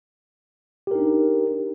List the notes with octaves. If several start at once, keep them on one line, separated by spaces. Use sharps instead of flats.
D4 D#4 G4 A#4